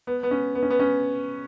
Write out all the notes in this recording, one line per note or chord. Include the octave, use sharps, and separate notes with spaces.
B3
B3
C#4
B3
C#4
B3
C#4